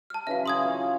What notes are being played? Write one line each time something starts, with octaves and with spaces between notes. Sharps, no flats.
A5 F6
C#3 E3 F#3 E5 F5
C#3 C6 D#6 G#6
F4 C#5